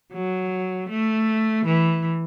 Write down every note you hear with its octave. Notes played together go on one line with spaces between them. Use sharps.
F#3
A3
E3